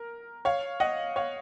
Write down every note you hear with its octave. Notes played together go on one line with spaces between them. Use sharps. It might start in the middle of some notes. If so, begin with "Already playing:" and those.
Already playing: A#4
C#5 F5
D#5 F#5
C#5 F5